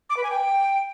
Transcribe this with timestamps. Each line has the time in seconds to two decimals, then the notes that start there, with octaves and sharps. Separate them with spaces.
0.10 D6
0.17 B4
0.24 G#5
0.31 G5